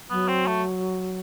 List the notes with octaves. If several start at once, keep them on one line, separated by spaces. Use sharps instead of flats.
F#3 B3
C4
A3